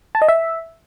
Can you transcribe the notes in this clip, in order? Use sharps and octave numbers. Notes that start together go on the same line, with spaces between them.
A5
D#5
E5